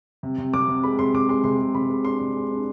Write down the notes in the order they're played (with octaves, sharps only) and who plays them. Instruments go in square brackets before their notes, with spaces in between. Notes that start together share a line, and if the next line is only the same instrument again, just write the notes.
[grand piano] C3
C3
C3 D6
C3
G#3 B5
C3 C6
C3 D6
G#3 C6
C3 C6
G#3
C3 B5
G#3
D4 C6
C3
G#3
D4